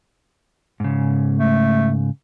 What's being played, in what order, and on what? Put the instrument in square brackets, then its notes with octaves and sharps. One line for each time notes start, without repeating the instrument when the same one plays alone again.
[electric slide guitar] G#2 C#3
[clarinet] A3